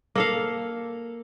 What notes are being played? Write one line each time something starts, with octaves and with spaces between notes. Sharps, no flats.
A#3 A4 F5